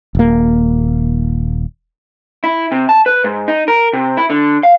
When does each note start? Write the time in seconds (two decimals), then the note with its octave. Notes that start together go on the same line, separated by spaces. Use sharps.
0.15 D#1 A#3
2.44 E4
2.72 C3
2.89 A5
3.06 B4
3.24 G#2
3.48 D#4
3.68 A#4
3.93 C3
4.17 E4
4.30 D3
4.63 F5